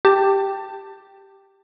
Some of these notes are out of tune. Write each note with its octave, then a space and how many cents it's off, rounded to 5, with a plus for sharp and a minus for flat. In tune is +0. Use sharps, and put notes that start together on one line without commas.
G4 +0 A5 +20